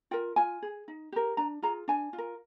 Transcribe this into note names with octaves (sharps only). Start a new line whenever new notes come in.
F4 A#4 G5
F4 G#5
G#4
D#4
G4 A#4
D4 A#5
F4 G#4 A#5
D4 G#5
F4
A#4